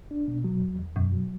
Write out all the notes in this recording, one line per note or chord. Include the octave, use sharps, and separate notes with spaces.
D4
B2
F#3
E2
E2
F#2 B2
F#3